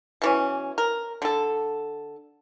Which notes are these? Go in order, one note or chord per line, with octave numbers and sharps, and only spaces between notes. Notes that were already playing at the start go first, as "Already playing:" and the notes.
B2 E3 C#4
A#4
D3 A4